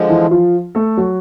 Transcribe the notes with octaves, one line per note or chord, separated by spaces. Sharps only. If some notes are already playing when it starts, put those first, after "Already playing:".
Already playing: D3 F3 G#3
E3 E4
F3 F4
A3 A4
F#3 F#4